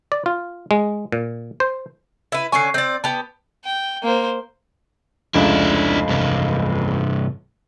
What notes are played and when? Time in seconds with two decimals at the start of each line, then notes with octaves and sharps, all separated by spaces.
0.12 D5
0.26 F4
0.71 G#3
1.12 A#2
1.60 C5
2.32 E4 B4
2.52 D3 C#4 G#5 C#6 C7
2.74 C4 D5 G6
3.04 B3 G4 A5
3.65 G5
4.02 A#3 C5
5.34 F1 C#2 D4 E4
6.09 G2 C3